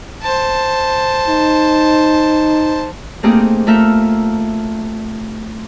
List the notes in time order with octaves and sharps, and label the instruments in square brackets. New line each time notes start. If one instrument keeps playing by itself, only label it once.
[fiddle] C5 A5
[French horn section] D#4
[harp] A3 A#3 C4 D#4 G4 G#4
A3 F4 A4 A#4 E5